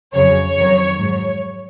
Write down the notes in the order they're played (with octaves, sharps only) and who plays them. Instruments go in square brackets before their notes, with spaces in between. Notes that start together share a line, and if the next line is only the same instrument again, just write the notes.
[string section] F2 C#3 F#3 C#5
F2 D#3 F#3
G#2 F#3